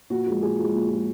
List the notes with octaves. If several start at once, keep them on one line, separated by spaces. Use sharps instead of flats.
A#2 F#4
F3 G#3
A#2 G#4
F3 G#3
A#2
F3 G#3